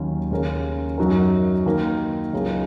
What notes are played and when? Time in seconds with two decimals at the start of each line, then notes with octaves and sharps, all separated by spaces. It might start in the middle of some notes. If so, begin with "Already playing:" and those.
Already playing: D#2 D#3 F#3 C#4
0.31 D#2 C#3 G#3 C#4 A#4
0.98 F#2 F#3 D#4 F#4 A#4
1.66 D#3 A#3 D#4 A#4
2.33 C#2 C#3 F#3 D#4 G#4